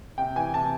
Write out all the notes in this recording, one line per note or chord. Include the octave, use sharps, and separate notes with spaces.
C3 G5
E3 G#5
C3 A5